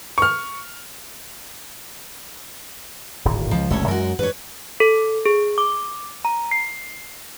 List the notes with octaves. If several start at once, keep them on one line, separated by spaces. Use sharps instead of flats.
C#6 F6
D1 G#1 A#2
C#2 F3
F#1 C2 B2 A3 C#4 C#5
F#2 G#3 F#4 A#4
G2 B4 C#5
A4
G#4
D6
A#5
C7